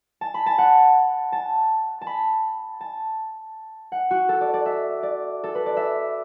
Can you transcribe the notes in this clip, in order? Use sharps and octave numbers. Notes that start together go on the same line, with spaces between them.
A5
B5
A5
F#5
A5
A5
B5
A5
F#5
F#4
A4
D5
D5
E5
D5
A4
B4
D5
E5